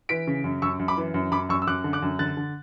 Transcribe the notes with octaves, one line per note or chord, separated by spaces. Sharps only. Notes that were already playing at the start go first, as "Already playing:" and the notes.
E3 B6 D7
C#3
F#2
F#2 C#6 E6
F#2
B5 D6
E3
F#2
F#2 B5 D6
F#2 C#6 E6
E6
F#2 D6 F#6
D3
D6 F#6
F#2
D3 F#6 A6
D3